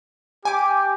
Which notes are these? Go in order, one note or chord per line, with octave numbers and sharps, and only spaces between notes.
G4 G#5 D6